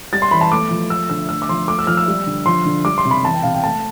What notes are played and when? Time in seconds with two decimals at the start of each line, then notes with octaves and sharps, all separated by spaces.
0.13 G3 A6
0.22 C6
0.31 E3 B5
0.41 A5
0.51 A3 D6
0.71 F3
0.90 A3 E6
1.10 D3 E6
1.29 A3 E6
1.42 D6
1.49 F3 C6
1.68 A3 D6
1.79 E6
1.87 F3 F6
1.97 E6
2.08 G3
2.26 D3
2.46 F3 C6
2.65 D3
2.85 G3 D6
2.98 C6
3.05 C3
3.11 B5
3.24 E3 A5
3.34 G5
3.43 C3 F5
3.54 G5
3.64 A3 A5